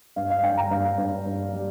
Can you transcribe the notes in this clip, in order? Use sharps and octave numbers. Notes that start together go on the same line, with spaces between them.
G2 F5
F5
G2 G5
A#5
G2 F5
G2
G2
G3